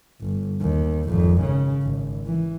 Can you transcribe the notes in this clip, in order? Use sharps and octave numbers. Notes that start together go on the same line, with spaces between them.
G1
D#2
G#1 F2
C#3
G#1
E3